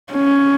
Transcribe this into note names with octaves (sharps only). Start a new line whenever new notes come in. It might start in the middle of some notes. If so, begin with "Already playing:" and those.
C#4